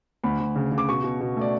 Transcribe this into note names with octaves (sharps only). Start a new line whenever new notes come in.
D2 B5
D2
C#3
C#3
D6
B2 C#6
B2
B2
A3 D5